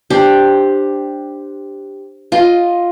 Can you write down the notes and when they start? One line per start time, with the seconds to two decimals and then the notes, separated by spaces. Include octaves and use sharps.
0.10 D4 G4 C5 D5
2.32 F4 D#5